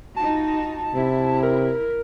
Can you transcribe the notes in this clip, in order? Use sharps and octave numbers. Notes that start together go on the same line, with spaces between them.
D#4 F4 F#4 A5
C3 E4
A#4